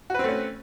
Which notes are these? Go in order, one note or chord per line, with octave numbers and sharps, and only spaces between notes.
A3 C4 C#4 F#4 B4